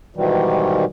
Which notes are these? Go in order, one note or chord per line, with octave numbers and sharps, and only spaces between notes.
G#2 B2 D#3 E3 G3